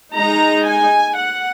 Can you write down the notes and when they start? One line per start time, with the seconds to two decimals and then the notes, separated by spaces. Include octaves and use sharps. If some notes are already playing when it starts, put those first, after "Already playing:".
0.14 G#3 D#4 A#5
0.66 G#5
1.16 F#5